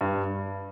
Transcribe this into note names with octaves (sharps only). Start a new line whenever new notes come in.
G2